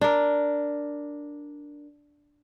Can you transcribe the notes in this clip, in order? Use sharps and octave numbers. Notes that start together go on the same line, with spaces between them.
D4 A#4